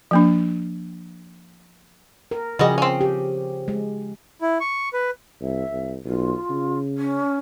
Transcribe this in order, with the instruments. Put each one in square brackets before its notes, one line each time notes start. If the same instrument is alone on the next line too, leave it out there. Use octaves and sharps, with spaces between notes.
[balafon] F3 A#3 D4
[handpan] A#4
[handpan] C#3 F3 G#4 [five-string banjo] G3 F#4 D#5
[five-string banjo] C4 C#4
[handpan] G4
G#3
[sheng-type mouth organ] E4
C#6
B4
[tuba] C2 [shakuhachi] E5
[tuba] C2
[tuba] B1 [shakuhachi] F4
[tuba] C#3
[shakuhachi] C#4